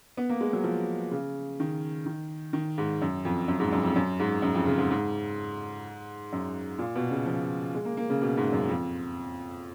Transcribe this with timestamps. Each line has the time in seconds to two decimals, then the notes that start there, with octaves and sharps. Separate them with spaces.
0.17 B3
0.30 A#3
0.41 G#3
0.53 F#3
0.64 F3
1.11 C#3
1.60 D#3
2.06 D#3
2.53 D#3
2.78 G#2
3.02 F#2
3.25 F2
3.48 F#2
3.60 G#2
3.72 F#2
3.83 F2
3.96 F#2
4.20 G#2
4.42 F#2
4.55 F2
4.66 C#3
4.78 G#2
4.91 G#2
6.33 F#2
6.79 A#2
6.96 B2
7.11 C#3
7.26 F3
7.74 G#3
7.85 A#3
7.97 A#3
8.10 C#3
8.22 B2
8.37 G#2
8.53 F#2
8.69 F2